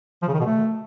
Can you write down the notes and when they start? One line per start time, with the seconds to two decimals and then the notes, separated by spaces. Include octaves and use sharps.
0.22 F3
0.28 C#3
0.34 D#3
0.40 B2
0.46 A3